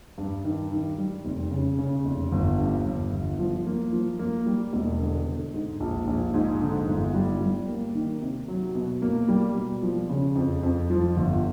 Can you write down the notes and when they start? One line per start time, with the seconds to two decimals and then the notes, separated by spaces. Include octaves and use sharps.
0.18 G2
0.44 D#3
0.71 D#3
0.98 G3
1.25 F1
1.51 C#3
1.78 C#3
2.05 F1
2.32 G1
2.59 G2
2.85 G1
3.12 G1
3.39 F3
3.66 A#3
3.93 F3
4.19 A#3
4.46 G3
4.73 E1
5.00 D3
5.27 D3
5.54 G#2
5.80 A#1
6.07 A#1
6.34 G#2
6.61 D3
6.87 G1
7.14 G3
7.41 G3
7.68 A#3
7.95 D#3
8.21 C3
8.48 F#3
8.75 B2
9.02 A#3
9.28 G3
9.55 B2
9.82 F3
10.09 C#3
10.35 F2
10.63 F2
10.90 F3
11.17 G1